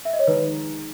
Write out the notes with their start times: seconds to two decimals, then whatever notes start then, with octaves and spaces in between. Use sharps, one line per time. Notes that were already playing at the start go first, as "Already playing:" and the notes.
0.05 E5
0.13 D#5
0.19 C#5
0.27 D#3 G#3 D#4 B4